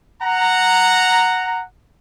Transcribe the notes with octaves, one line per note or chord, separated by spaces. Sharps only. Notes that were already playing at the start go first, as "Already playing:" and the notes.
F#5 A#5